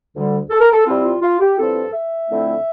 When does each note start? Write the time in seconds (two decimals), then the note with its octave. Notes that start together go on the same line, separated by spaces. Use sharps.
0.14 D2 D3 G3
0.50 A4
0.61 A#4
0.72 A4
0.86 C3 G3 C4 E4 F4
1.04 F4
1.22 F4
1.40 G4
1.58 G2 F3 C4 E4 A4
1.94 E5
2.30 F2 D3 A3 C4 E4